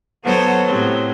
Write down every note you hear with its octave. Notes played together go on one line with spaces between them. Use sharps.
F#3 B3 F#4 A4 C5 C#5
A2 C3 F#3